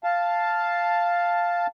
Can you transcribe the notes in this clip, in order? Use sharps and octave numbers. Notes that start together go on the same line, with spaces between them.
F5 A5